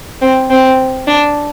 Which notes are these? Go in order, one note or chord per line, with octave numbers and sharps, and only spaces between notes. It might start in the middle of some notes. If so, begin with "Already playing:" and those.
C4
C4
D4